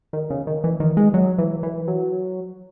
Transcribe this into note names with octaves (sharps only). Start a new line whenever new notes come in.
D#3
C#3
D#3
E3
D#3
G#3
F#3
E3
E3
F#3